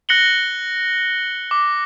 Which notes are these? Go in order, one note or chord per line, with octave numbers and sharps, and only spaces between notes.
F#6 A#6 C#7 F#7 G7
D6